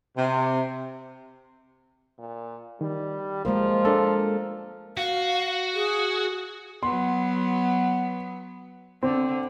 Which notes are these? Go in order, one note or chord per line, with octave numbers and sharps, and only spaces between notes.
C3
A#2
D#3 G3
F3 G#3 A#3 A#4
G#3 D4 A4 A#4
F#4 F5
G#4
F#3 B3 C6
D3 C4